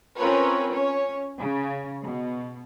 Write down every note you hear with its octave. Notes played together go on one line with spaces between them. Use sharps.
C4 C#4 F4 A#4 B4 C#5
C#4 C#5
C#3
B2